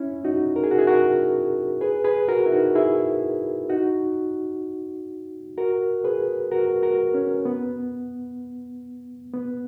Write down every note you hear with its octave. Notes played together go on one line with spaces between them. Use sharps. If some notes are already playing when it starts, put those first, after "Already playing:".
Already playing: C#4 E4
D#4 F#4
A#4
G#4
F#4
E4 G#4
F#4 A#4
G#4 B4
G#4 B4
F#4 A#4
E4
D#4 F#4
E4 G#4
D#4 F#4
F#4 A#4
G#4 B4
F#4 A#4
F#4 A#4
C#4
B3
B3